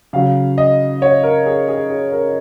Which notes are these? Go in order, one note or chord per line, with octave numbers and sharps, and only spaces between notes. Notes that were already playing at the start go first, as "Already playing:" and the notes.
C#3 F#3 F5
D#5
C#5
A#4
G#4
G#4
G#4
A#4